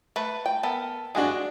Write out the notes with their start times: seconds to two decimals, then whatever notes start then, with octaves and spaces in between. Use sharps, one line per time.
0.16 A3 B4
0.46 G5
0.63 B3 A4 A#4
1.15 G#3 D4 F#4 G#4